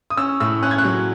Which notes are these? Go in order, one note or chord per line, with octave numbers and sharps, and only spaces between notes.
D#6
C#4 E6
A2 E6
C#4 F#6
G#6
F#6
F#3